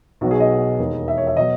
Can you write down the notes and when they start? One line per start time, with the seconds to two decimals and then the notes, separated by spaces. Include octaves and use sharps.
0.21 B1 B2 F#3 F#4
0.31 G#4
0.40 D#5
0.79 E1 D#2 D#3
1.08 E5
1.18 C#5
1.27 E5
1.37 B2 F#3 D#5